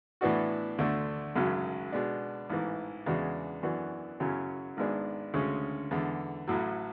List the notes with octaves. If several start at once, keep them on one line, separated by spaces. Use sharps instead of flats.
A2 E3 B3 D4 F#4
D2 D3 A3 D4
G#1 F#2 C#3 F#3
B2 G#3 D4
A1 G#2 E3
E2 C#3 G#3 D4 F#4
F#2 E3 B3 D4 F#4
F#2 C#3 F#3 C#4 E4
G#1 G#2 G#3 B3 D4
D2 C#3 G#3 C#4
E2 D3 G#3
A1 A2 F#3